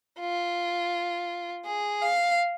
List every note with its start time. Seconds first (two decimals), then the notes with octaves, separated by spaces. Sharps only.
0.20 F4
1.66 G#4
2.02 F5